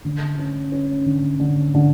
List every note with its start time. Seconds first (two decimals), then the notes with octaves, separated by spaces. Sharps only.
0.05 D3
0.38 C#4
0.72 C#4
1.06 D3
1.40 D3
1.75 D3